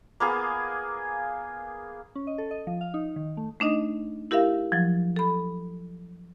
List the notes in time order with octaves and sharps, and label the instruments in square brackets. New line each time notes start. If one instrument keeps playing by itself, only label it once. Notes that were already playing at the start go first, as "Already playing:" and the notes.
[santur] A#3 B3 G#4
[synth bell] C#4
D#5
A4
D#5
F3
F5
D#4
D#3
A3
[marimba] A3 D4 D#4 D#5
E4 G4 A#4 E5 F5
F3 F#3
A4 B5